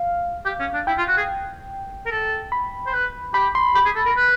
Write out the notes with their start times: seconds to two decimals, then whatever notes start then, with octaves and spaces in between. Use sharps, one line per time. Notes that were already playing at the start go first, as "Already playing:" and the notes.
Already playing: F5
0.45 G4
0.60 C#4
0.74 D4
0.87 E4 G5
0.98 F4
1.08 F#4
1.17 G#4
2.06 A#4
2.11 A4
2.52 B5
2.87 C5
2.93 B4
3.34 G4 B5
3.55 C6
3.75 G4 B5
3.85 G#4
3.95 A4
4.06 A#4
4.17 B4